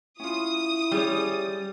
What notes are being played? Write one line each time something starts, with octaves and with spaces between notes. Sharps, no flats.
C#4 E4 F4 D#6
G3 C#4 G#4 C#5